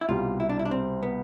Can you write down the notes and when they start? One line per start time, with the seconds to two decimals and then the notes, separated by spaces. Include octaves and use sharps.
0.01 E4
0.09 C2 B2 G3 F4
0.40 E4
0.49 D4
0.59 E4
0.65 D4
0.71 C4
1.03 B3